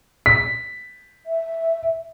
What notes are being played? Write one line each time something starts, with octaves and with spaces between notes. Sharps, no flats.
B6
E5